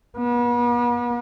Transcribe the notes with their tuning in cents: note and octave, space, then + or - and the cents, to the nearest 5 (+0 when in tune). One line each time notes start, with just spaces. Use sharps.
B3 -40